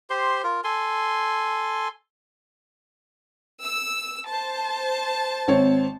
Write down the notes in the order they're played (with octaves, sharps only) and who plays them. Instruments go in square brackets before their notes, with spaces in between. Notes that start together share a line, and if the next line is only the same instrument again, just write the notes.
[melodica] G4 C5 C6
F4 A#4
A4 G#5 C6
[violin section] E6
C5 A5
[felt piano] G#1 C4 C#5